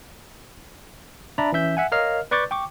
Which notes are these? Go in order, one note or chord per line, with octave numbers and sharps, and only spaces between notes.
D4 D5 E5 A#5 B5
E3 C#4 E5 G6
E5 F#5 G#5
A#4 C#5 D#5 F5 F6
B4 D5 C#6 D6 G6 A6
G5 C#6 D6